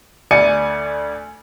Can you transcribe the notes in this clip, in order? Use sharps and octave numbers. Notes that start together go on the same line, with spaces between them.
D2 D5 G#5 C#7 D#7